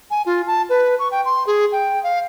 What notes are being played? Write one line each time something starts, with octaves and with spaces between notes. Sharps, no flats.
G#5
F4
A5
B4
C#6
G5
C6
G#4
G5
F5